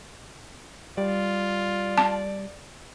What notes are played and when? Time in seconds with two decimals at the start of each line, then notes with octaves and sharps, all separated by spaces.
0.98 G3 F4 D5
1.98 A5